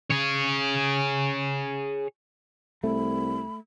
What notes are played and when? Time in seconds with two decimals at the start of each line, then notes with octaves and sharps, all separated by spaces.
0.11 G#4 C#5
2.84 C2 A3 B5